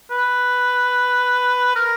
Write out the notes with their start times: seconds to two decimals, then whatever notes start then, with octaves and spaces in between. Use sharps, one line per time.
0.11 B4
1.76 A#4